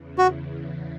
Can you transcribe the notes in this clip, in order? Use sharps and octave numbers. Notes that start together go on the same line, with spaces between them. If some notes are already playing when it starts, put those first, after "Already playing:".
Already playing: E2 C#3 E3
F#4